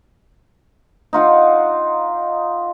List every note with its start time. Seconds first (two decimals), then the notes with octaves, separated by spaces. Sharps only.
1.13 D#4 F4 F#5